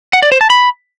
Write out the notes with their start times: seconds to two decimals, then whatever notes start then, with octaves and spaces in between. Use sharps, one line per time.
0.13 F#5
0.22 D5
0.32 C5
0.41 A5
0.50 B5